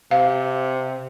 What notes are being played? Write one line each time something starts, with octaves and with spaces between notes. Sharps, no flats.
C3 F5